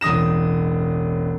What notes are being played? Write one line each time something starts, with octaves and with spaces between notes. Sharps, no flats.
E1 A1 D#6 A#6 E7